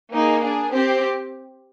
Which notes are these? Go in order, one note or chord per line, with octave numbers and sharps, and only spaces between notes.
A#3 D#4 G#4
D4 G#4
C4 G4 C5